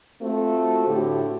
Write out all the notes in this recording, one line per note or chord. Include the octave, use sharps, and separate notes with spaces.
A3 C4 F4 F#4
A2 D3 F#4 G4